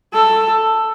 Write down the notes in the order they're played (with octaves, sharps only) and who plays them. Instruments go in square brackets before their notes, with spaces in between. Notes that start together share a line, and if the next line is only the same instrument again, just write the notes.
[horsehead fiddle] A4